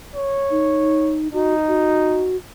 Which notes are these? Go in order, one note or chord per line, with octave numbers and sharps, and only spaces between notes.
C#5
D#4
D#4 F#4
F#4